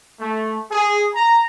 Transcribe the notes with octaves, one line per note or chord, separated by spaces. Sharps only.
A3
G#4
A#5